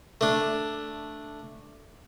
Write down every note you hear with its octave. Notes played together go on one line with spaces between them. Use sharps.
A3 D4